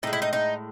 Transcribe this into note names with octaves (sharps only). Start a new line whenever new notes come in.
A2 G#3 D#4
E4
D#4
D#4